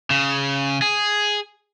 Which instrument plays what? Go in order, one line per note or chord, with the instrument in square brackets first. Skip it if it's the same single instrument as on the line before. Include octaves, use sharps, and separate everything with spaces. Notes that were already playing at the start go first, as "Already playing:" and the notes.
[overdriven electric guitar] C#3
G#4